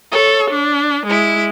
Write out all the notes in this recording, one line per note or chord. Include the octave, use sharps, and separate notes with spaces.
A4 C#5
D4
G#3 E4